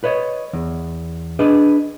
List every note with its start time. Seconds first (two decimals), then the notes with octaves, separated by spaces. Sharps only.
0.04 B4 C#5 D#5
0.53 E2
1.39 D4 G#4 B4 D#5